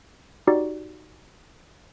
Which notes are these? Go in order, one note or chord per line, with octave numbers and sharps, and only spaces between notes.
D#4 F#4 G4 D5